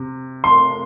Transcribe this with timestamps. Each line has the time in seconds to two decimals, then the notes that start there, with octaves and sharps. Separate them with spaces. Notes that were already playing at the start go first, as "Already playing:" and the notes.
Already playing: C3
0.44 C6